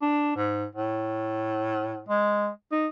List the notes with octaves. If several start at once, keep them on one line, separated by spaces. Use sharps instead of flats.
D4
G#2
A2
G#3
D#4